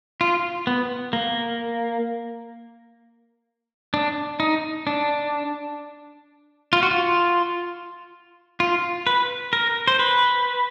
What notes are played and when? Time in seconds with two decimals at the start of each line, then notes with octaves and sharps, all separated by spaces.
0.21 F4
0.67 B3
1.13 A#3
3.94 D4
4.40 D#4
4.87 D4
6.73 F4
6.83 F#4
6.91 F4
8.60 F4
9.07 B4
9.53 A#4
9.87 C5
9.99 B4